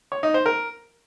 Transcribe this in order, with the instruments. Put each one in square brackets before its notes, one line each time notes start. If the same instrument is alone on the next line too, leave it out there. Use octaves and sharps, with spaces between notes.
[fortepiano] C#5
D#4
C5
A#4